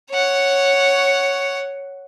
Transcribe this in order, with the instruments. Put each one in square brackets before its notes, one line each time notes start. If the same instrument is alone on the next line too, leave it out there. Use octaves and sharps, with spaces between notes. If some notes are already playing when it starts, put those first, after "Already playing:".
[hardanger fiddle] C#5 F#5